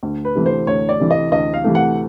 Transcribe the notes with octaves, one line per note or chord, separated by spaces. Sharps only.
D2
B4
C3 E3 A3
C5
D2 C#5
D5
C3 E3 A3
D#5
D2 D#5
F5
C3 E3 A3
F#5